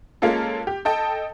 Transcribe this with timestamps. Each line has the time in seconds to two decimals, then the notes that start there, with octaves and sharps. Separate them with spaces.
0.22 G#3 A#3 C#4 F4 A4
0.67 G4
0.85 A4 D#5 G5 A5